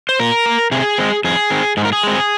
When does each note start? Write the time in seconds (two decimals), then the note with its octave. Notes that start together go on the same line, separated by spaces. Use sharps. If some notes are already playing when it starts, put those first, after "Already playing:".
0.09 C5
0.19 A#2 A#4
0.46 A#3
0.71 C3 G#4
0.98 G#3 C4
1.24 F2 G#4
1.50 D#3 C4
1.77 G#2 G#4
1.85 A#4
1.93 G#4
2.03 G#3 C4